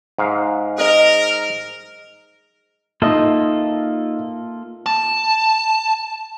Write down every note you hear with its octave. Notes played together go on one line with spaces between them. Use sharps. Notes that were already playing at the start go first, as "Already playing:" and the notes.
G#2 F5
G#4 A#4 D#5
A#3 D#4 F4 A4 D#5 E5
A5